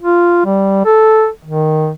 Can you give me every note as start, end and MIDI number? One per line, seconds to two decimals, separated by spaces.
0.02 0.41 65
0.46 0.83 55
0.85 1.27 69
1.45 1.91 51